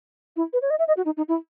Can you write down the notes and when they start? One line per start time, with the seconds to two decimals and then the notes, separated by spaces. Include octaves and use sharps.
0.36 E4
0.53 B4
0.62 C#5
0.70 D#5
0.79 E5
0.88 D#5
0.97 F#4
1.06 D#4
1.17 D#4
1.28 E4